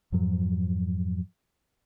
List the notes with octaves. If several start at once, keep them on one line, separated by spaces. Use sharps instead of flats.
F2 G#2 F3 F#3